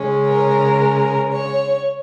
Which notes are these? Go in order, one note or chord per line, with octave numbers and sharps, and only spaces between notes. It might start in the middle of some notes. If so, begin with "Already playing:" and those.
Already playing: C#3 G#3 C#4
A#4
C#5